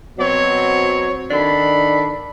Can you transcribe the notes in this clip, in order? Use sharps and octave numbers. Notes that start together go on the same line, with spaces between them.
B2 F#3 C4 C#5
D#3 D4 A4 B5